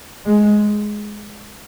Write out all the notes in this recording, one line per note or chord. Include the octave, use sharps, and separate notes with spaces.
G#3